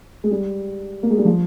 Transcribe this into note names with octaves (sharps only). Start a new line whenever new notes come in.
G#3
G3
A#3
G#3
G3
F3